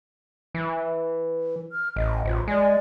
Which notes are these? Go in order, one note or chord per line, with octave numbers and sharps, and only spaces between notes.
E3
F6
A1 D#5
A1 F4 C5
G#3 D5 G#5